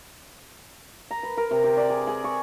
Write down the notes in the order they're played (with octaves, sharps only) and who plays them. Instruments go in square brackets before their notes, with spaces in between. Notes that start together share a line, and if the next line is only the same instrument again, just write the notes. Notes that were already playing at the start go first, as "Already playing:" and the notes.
[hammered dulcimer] A#5
B4
A#4
C3
G4
D5
G#4
G#4
C#6